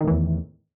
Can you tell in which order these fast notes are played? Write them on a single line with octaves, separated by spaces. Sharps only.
D#3 A2 E3 E2